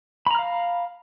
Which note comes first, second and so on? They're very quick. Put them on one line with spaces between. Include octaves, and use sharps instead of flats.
B5 A#5 F6 F5